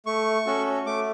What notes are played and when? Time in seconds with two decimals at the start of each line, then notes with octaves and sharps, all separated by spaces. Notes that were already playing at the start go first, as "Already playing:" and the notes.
0.06 A3 C#6
0.46 C#4 F#4 A4
0.86 A3 D6